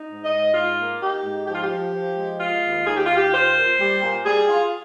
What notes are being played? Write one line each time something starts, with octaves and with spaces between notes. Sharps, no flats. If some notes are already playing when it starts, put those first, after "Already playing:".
Already playing: D#4
G#2
D#5
G#2
G#2 F4
A#3
D#4 G4
G#2
F3 G4
F4
G4
F3
F3
G#3
G#3 F4
D#2
D#2 G#4
G4
D#2 F4
G4
F4 C5
A#2
G3
A#2
G3 G#4
F4